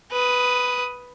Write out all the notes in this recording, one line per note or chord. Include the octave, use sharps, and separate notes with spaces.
B4 D#6